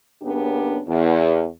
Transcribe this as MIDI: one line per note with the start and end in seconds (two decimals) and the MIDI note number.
0.22 0.80 42
0.22 0.80 49
0.22 0.80 58
0.22 0.80 59
0.22 0.80 62
0.22 0.80 67
0.87 1.46 40